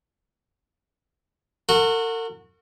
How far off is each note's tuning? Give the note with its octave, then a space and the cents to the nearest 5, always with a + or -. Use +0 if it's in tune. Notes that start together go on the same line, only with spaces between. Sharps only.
F#4 -20 A#4 -45